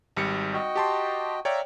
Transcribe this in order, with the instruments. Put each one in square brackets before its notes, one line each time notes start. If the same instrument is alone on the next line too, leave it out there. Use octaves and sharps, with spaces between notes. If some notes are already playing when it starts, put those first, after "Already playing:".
[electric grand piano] G#1 G3 C#7
[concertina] F#4 D#5 G5
[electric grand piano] G4 A5 C6
[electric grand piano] C#5 D5 G5 [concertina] E5 F5 A#5